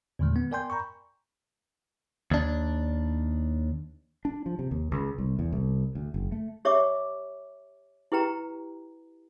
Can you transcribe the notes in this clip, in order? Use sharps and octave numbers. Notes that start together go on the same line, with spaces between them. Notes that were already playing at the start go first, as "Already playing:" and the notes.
E2 A#2 D3 D#3 G#3 A3
B3
A#4 D5 G5 G#5 C6 G6
A#5 B5 C#6
D#2 D4
D4
F3
C3
D#2
C#2
C2
E2
C2
D2
F#1
A3
G4 C#5 E5 C#6 D6
E4 G4 B4 G5 A#5